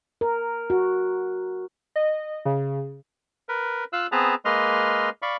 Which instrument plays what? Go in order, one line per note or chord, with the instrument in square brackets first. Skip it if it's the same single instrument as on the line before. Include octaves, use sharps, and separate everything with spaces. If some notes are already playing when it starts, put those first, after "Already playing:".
[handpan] A#4
F#4
[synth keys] D#5
C#3
[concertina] A#4 B4
F4 F5 E6 F#6
B3 C4 G#4 B4 A5 A#5
G#3 A#3 B4 D#5 C6 F6
D5 F5 B5 C#6